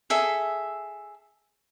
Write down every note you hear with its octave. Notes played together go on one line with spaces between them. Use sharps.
G#4 A4 E5